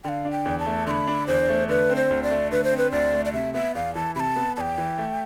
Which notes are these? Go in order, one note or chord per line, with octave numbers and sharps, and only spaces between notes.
D3 F5 G5
D4
G5
E2
A5
A3
D3 B5 C6
D4
E2 C5
A3
D3 B4
C4
C5
D2
D5
A3
D3 B4
C5
C4
B4
D2 D5
A3
D5
C3 E5
B3 E5
E2 F5
E3 A5
C3 A5 B5
B3
E2 G5 A5
E3
A3